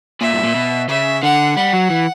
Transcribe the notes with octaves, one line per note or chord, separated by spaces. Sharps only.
A#2 E5
G2
A#2
B2
C#3 E5
D3 F#5
G3 F#5
F#3
E3